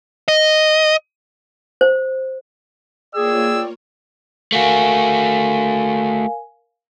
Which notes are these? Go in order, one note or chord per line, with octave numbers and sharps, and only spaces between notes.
D#5
C5
A#3 F4 G#4 C#5 D5 G5 E6
A3 F#4 A#4 F5 G#5